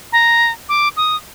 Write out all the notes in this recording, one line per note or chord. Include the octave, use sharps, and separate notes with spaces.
A#5
D6
D#6